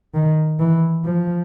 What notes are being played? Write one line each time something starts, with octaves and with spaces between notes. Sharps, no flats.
D#3
E3
F3